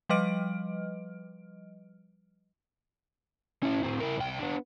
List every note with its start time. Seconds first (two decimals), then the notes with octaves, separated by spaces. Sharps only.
0.09 F3 G3 B4 D#5 F6 D7
3.63 C#4 E4
3.83 A2 C4
4.00 E4 A#4
4.16 C2 G5
4.39 B3 D4